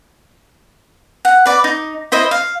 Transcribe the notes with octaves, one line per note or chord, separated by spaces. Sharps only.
F#5
B4 D5
D#4
E4 C5 D#5 E5
F5